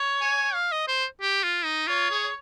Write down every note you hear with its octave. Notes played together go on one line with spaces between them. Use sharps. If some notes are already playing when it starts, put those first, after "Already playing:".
Already playing: C#5
G#5
F5
D#5
C5
G4
F4
D#4
F4 C#5
G#4